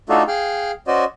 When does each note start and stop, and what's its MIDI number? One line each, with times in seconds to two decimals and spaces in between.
0.09 0.23 57
0.09 0.23 62
0.09 0.23 63
0.09 0.23 65
0.09 0.23 66
0.09 0.23 69
0.28 0.72 68
0.28 0.72 77
0.28 0.72 79
0.87 1.04 61
0.87 1.04 66
0.87 1.04 72
0.87 1.04 74
0.87 1.04 75